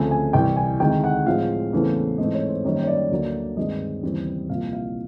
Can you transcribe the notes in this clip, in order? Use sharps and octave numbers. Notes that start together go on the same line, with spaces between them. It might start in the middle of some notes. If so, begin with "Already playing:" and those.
Already playing: D2 C#3 F3 A3 C4 G#5
G#5
C2 C3 E3 G5
G#5
D2 C3 D#3 G#3 G5
F#5
A2 F3 G#3 C4 F5
E2 C#3 E3 A3 C4
G#2 E3 A3 C4 D#5
C#5
C5
F#2 D#3 G3 A#3 C#5
C#5
D5
D2 D3 F#3 A#3
G2 D#3 G#3 C4 D#5
D#2 C#3 E3 G3 C4
C2 A#2 F3 F5
F5